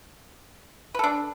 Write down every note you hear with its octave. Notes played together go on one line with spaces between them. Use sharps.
D4 A4 B4